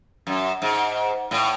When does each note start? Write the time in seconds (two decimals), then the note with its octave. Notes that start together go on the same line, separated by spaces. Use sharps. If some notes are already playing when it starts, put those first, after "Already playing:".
0.27 F#2
0.62 G#2
1.31 A2